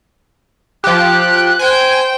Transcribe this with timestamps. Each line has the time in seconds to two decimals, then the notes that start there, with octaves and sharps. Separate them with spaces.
0.84 F3 G4 F#6
1.59 C5 G5 G#5